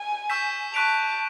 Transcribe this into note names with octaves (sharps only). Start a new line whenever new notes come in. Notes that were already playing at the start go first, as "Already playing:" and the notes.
Already playing: G#5
C#6 E6 G6 B6 E7
A5 C#6 F#6 B6 D7 F7